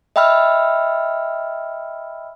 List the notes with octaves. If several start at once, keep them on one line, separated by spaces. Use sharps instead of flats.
D#5 E5 G5 B5 E6 F6